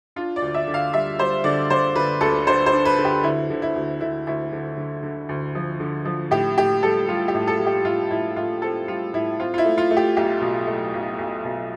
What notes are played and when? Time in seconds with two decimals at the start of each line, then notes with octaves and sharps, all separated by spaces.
0.16 D4 F4
0.36 D5
0.42 D2
0.54 E5
0.67 D3
0.74 F5
0.93 G3 E5
1.19 G3 C5
1.44 D3 D5
1.70 D3 C5
1.95 D3 B4
2.21 D2 A4
2.47 D3 C5
2.66 C5
2.73 D4
2.85 B4
2.98 D3
3.05 G4
3.23 D2 E4
3.50 D3
3.62 E4
3.76 D2
4.01 D3 E4
4.27 D2 E4
4.52 D3
4.77 D3
5.03 D3
5.29 D2
5.55 F3
5.80 D3
6.05 F3
6.31 A2 G4
6.57 A2 G4
6.83 G3 A4
7.08 G3 F4
7.28 G4
7.34 A2
7.47 A4
7.59 G3
7.66 G4
7.85 A2 F4
8.11 A2 E4
8.36 A2 F4
8.62 C4 A4
8.88 G3 F4
9.13 A2 E4
9.39 C4 F4
9.54 F4
9.58 E4
9.65 A3
9.78 F4
9.91 A3
9.97 G4
10.17 B1 G4
10.41 B2
10.67 A3
10.94 B1
11.18 B1
11.45 B2